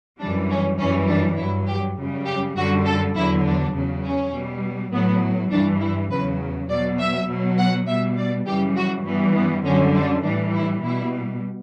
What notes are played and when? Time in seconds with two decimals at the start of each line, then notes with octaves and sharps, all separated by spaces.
0.20 F#2 E3 G3 D4
0.50 C#4
0.79 F#2 E3 G3 C#4
1.09 D4
1.38 G2 F#3 E4
1.68 G4
1.98 F#2 C#3 G3
2.27 G4
2.56 F#2 D3 G3 F#4
2.86 A4
3.16 E2 D3 F#3 E4
3.45 D4
3.75 E2 C#3 F#3
4.04 C#4
4.34 B2 G3
4.93 A2 F#3 B3
5.51 G2 E3 G3 D4
5.81 E4
6.11 E2 C#3 F#3 B4
6.70 B2 F#3 D5
7.00 E5
7.29 B2 F#3
7.59 F#5
7.88 B2 G3 E5
8.17 D5
8.47 F#2 C#3 E3 G3 G4
8.76 F#4
9.06 G2 E3 G3 B3
9.36 B3
9.65 F#2 D3 G3 C#4
9.95 D4
10.24 A2 E3 G3 D4
10.54 E4
10.84 B2 G3 E4